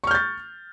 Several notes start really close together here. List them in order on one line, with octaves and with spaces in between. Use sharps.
C#6 F6 G6 A6